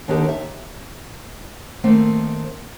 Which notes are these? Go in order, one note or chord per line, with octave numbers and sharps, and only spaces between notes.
D#2 D3 D#3 D#4 G4
E5
D#3 A3 A#3 C4